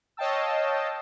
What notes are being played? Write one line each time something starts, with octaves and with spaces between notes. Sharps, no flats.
C#5 D#5 F5 G5 A5 E6